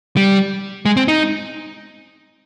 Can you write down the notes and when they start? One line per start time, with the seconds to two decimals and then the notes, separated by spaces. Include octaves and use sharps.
0.17 G3
0.85 G#3
0.97 C4
1.08 D#4